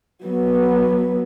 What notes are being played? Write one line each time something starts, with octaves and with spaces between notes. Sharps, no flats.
F#3 B3